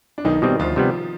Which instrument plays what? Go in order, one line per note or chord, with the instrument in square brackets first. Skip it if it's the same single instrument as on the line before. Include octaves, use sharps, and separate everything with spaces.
[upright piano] D4
[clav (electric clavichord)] B1 [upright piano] D#3 D#4
[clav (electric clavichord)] B2 G3 C4 [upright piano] D#3 D#4
[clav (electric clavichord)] D2 [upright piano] F3 F4
[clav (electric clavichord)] C3 G3 B3